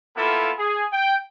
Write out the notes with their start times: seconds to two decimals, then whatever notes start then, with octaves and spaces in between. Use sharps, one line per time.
0.16 A#3 B3 E4 F4 A4
0.58 G#4
0.93 G5